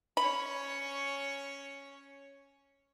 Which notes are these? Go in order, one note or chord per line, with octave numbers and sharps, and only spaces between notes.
C#4 C#5 B5